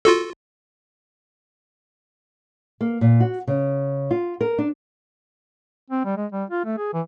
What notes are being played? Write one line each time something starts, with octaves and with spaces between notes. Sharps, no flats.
F4 F#4 A4
A#3
A#2
F#4
C#3
F4
A#4
D4
C4
G3
G#3
G3
F4
A3
G#4
E3